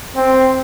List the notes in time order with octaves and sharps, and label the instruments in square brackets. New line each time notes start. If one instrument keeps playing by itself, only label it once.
[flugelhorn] C4